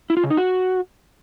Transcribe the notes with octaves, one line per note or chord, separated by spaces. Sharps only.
E4
F4
C#3
D#4
F#4